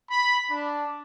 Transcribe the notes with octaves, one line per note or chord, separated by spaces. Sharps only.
B5
D4